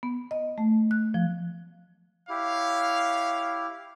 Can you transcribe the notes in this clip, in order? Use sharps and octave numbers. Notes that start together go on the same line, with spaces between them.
B3
D#5
A3
F#6
F3
E4 G4 C#5 F5